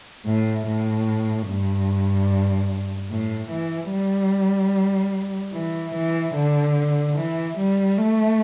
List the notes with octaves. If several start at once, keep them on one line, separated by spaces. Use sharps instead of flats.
A2
A2
G2
A2
E3
G3
E3
E3
D3
E3
G3
A3